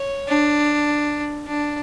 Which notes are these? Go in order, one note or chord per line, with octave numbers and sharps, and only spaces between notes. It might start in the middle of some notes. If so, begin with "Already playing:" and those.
Already playing: C#5
D4
D4